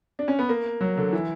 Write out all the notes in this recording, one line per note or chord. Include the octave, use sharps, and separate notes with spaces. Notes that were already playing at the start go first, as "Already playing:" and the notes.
D4
C#4
B3
A#3
F#3
D3
E3